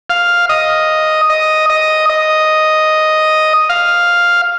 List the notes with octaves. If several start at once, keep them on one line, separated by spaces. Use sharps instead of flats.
F5
D#5
D#5
D#5
D#5
F5